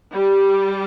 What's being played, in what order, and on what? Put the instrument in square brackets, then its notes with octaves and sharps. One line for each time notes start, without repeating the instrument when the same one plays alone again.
[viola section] G3